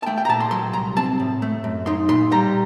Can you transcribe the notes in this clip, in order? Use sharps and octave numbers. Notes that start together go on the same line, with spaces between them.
A5
A3 G5
G5
A#5
A#2 A5
C6
F#3 C6
C2 A#5
C4 A5
A2
A3
F#2
D#4 C6
A#2 C6
G3 A#5